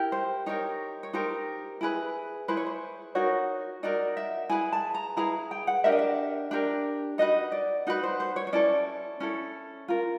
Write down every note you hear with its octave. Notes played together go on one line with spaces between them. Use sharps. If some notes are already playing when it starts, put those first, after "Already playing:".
Already playing: E4 G4 A#4
C5
D#4 G4 A#4 C#5
C#5
D#4 G4 A#4 C5
E4 G#4 B4
E4 G#4 B4 C5
C#5
C5
D#4 F#4 A#4 C#5
D#4 F#4 A#4 D5
E5
E4 G#4 B4 G#5
A5
A#5
E4 G#4 B4 A#5
G5
F#5
D4 G4 A#4 E5
D#5
E5
D4 G4 A#4
D#4 F#4 B4 D#5
D5
D#4 F#4 B4
C5
C5
C#5
C#5
C#4 E4 A4 D5
C#4 E4 A4
F4 A#4